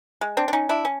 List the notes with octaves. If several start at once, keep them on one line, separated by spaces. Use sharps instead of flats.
G#3
C4 D4
D4
C#4 D#4
D4 E4
C#4